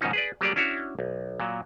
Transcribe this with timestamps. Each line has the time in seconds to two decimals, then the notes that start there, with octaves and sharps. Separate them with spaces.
0.01 G#2 B2 D#3 F3 C#4 D#4
0.13 G#4 B4 D5
0.41 F#3 G3 A#3 G4 G#4 D5
0.56 C#4 D4 E4 F#4 C#5
0.99 B1
1.40 A#2 F#3